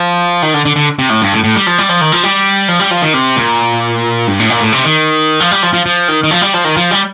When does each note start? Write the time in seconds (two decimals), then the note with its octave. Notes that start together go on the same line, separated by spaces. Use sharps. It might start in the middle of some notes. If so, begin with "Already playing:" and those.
Already playing: F3
0.42 D#3
0.54 D3
0.65 D3
0.76 D3
0.99 C3
1.10 A2
1.22 G2
1.33 A2
1.44 A2
1.56 G3
1.67 F3
1.78 G3
1.89 F3
2.01 D#3
2.12 F3
2.24 G3
2.68 F3
2.80 G3
2.91 F3
3.02 D#3
3.14 C3
3.37 A#2
4.28 G2
4.39 A2
4.50 A#2
4.61 A2
4.72 C3
4.84 D#3
5.40 F3
5.51 G3
5.63 F3
5.74 F3
5.86 F3
6.08 D#3
6.23 D#3
6.31 F3
6.41 G3
6.54 F3
6.65 D#3
6.76 F3
6.91 G3